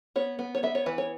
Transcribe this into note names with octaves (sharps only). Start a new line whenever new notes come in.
B3 C#5
B3
C#5
B3 E5
C#5
E3 B4
C#5